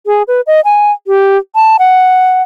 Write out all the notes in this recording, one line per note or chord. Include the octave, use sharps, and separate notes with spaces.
G#4
B4
D#5
G#5
G4
A5
F#5